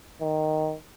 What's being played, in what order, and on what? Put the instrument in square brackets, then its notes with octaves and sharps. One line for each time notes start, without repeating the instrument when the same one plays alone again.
[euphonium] D#3